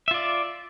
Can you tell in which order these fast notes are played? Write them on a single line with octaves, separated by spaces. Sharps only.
E5 F4 D5